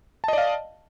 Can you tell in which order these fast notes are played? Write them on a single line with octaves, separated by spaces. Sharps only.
A5 D#5 D5 F5